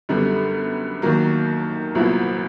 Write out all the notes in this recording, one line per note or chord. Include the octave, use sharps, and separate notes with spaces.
F#2 D3 G3 B3
D#2 D#3 F#3 A#3
C2 A#2 F#3 B3 E4